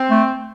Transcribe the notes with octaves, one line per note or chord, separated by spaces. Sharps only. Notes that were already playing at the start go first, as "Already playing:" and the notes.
Already playing: C4
A3